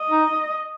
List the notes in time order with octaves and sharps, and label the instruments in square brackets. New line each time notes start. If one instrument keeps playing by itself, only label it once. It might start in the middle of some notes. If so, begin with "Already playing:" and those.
Already playing: [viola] D#5
[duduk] D#4